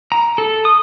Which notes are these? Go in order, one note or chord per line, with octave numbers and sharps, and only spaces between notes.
A#5
A4
D#6